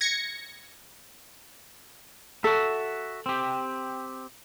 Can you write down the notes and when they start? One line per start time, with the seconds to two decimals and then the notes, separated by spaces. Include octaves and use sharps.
0.01 G#6 A#6 C#7
2.44 F#4 A4 E5
3.26 C4 G4